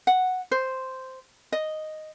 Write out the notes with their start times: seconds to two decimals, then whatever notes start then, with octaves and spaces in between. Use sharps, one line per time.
0.07 F#5
0.51 C5
1.52 D#5